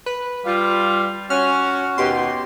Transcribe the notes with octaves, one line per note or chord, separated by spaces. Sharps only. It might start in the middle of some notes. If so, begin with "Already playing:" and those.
B4
G3 F4
C#4 F#4 F6
D#2 B2 G4 C6